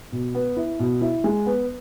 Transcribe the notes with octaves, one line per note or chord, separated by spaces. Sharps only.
B2
B3
E4
B2
E4
G#3
B3